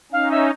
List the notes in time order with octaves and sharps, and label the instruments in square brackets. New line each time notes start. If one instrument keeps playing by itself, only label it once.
[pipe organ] C#4 D#4 [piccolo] F5
[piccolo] E5